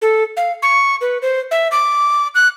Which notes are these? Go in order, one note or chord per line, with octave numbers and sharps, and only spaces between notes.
A4
F5
C#6
B4
C5
E5
D6
F#6